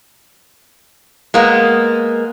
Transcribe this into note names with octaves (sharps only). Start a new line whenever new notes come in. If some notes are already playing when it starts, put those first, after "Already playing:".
G#3 A#3 B3